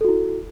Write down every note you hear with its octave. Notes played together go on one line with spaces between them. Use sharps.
E4 F#4 A4